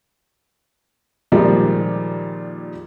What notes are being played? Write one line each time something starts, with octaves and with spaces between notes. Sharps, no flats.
A#2 D#3 F3 G3 G#3